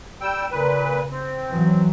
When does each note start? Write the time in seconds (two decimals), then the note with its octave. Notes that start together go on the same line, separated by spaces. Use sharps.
0.21 G3 G5 E6
0.51 A#2 C#3 B4
1.11 C4
1.49 E3 F#3